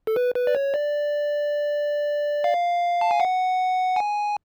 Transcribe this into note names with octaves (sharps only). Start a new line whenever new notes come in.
A4
B4
B4
D5
C#5
D5
F5
A5
G#5
F#5
G#5